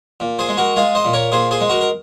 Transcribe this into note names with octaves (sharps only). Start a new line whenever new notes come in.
A#2
G#4 C5
G#3
F#4 A#4
G#3 F4 G#4
C5 D#5
A#2
A#4 C#5
A#2 G#4 C5
G#4 C5
G#3
F#4 A#4
A#4